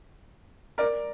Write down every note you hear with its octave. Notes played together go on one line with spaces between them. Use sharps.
A#4 D5